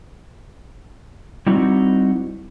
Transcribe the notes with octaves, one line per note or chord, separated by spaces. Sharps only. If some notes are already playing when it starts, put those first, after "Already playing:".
G3 C4 D#4 E4 F#4